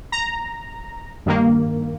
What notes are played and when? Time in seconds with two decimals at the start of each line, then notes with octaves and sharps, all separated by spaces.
0.12 A#5
1.26 G2 D#3 A#3